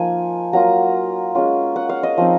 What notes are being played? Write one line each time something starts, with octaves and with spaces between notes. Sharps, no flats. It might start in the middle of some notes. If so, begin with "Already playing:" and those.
Already playing: F3 A#3 D#4 G#5
F#3 A#3 F4 A#5
G#3 C#4 F4
F#5
F5
D#5
F3 C4 D#4